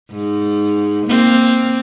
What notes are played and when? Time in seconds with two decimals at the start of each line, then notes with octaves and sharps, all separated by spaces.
0.11 G#2
1.07 A#3 C4